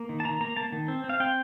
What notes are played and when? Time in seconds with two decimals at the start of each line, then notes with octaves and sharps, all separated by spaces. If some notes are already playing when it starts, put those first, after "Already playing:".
Already playing: A#3
0.09 D#3
0.20 A5
0.25 D#3 A#5
0.41 A#3 A#5
0.56 A#3 A5
0.72 D#3
0.88 C4
1.04 C4
1.09 F5
1.20 C4 G5